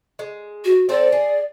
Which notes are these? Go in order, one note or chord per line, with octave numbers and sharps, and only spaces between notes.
G#3
F#4
C4 A4 C5 D5
G#4